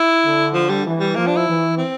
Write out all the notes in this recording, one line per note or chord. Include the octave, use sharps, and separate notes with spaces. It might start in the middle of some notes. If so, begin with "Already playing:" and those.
Already playing: E4
D3
F3
G3
E3
G3
F3 A#3
D4
E4
E3
C4